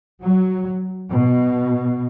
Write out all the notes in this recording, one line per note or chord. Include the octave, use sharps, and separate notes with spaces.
F#3
B2